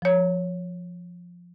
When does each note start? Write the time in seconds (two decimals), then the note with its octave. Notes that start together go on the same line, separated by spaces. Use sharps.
0.02 F3 C#5